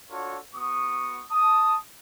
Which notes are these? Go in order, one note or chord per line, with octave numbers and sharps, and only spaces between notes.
D4 F4 F#4 A4 C#5
B3 F#4 C#6 D#6
A5 D#6